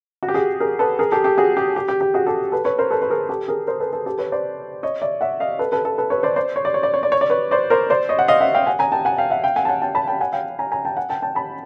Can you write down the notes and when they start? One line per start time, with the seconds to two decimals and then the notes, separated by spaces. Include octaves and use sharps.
0.23 F#4
0.28 G4
0.34 F#4 G#4
0.60 G#4 A#4
0.79 A4 B4
0.99 G#4 A#4
1.12 G4 A4
1.24 G4 A4
1.38 F#4 G#4
1.57 G4
1.76 G4
1.88 G4
2.01 G4
2.14 F#4 G#4
2.26 G4 A4
2.52 A4 B4
2.65 B4 C#5
2.78 A#4 C5
2.91 A4 B4
3.02 B4
3.10 G#4 A#4
3.29 G4 A4
3.48 G#4 A#4
3.67 A#4 C5
3.80 A4 B4
3.93 A4 B4
4.06 G4 A4
4.18 B4 C#5
4.32 C5 D5
4.83 C#5 D#5
5.01 D5 E5
5.21 E5 F#5
5.40 D#5 F5
5.59 A4 B4
5.72 A4 B4
5.85 A4 B4
5.98 A4 B4
6.10 B4 C#5
6.23 C5 D5
6.36 C5 D5
6.56 C#5
6.65 D5
6.74 C#5
6.83 D5
6.94 C#5
7.03 D5
7.12 C#5
7.21 D5
7.30 B4 C#5
7.51 C5 D5
7.70 A#4 C5
7.90 C5 D5
8.09 C#5 D#5
8.19 F#5
8.28 D#5 F5
8.41 E5 F#5
8.54 F5 G5
8.66 F#5 G#5
8.79 G#5 A#5
8.92 G5 A5
9.05 F#5 G#5
9.18 F5 G5
9.30 E5 F#5
9.44 F5 G5
9.56 F#5 G#5
9.65 A5
9.69 F#5 G#5
9.82 G5 A5
9.95 A5 B5
10.07 G5 A5
10.21 F#5 G#5
10.33 F5 G5
10.59 G#5 A#5
10.72 G#5 A#5
10.85 G5 A5
10.97 F#5 G#5
11.10 G5 A5
11.22 G5 A5
11.35 A5 B5